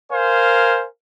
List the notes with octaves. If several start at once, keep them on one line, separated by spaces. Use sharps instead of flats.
A#4 C5 F5 G#5